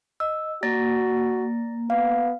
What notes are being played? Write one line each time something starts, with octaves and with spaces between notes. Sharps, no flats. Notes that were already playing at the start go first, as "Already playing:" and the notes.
D#5 E6
A#3 F#4 D5 A6 A#6
B3 F5